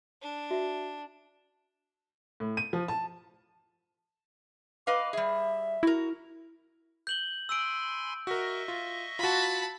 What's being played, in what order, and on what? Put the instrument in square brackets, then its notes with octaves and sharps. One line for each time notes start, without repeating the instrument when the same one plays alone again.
[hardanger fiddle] D4
[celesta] F#4 E5
[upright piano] A2
D#7
F3
A5
[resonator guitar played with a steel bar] B4 D#5 F5 [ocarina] D6
[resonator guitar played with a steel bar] G3 G#4 [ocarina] E5
[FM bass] E4 [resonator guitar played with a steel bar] F#4 A#4
[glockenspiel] G6 F#7 G7
[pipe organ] G#5 B5 C6 [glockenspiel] E6 D7
[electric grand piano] F#4 A#4 [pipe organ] D#5 E5 C#6
[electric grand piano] F4
[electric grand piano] F4 F#4 [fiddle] A5 B5